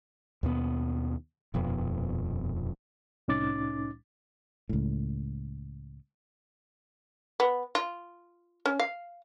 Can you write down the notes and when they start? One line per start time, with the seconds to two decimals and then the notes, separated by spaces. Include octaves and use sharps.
0.43 D#2 B2 B3
1.54 D#1 F2 B2
3.28 C2 A2 C#4 D#4 D6 A6
4.69 C#2 A2
7.40 B3
7.75 F4
8.66 C#4
8.80 F5